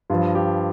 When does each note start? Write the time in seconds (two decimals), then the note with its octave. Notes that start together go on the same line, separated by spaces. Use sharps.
0.10 G2 F3 F4
0.35 G4